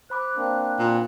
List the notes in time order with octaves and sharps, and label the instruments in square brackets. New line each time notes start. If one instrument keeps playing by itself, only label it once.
[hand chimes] C5 B5 D6 [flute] F#6
[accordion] A#3 C4 D4
[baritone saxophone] A#2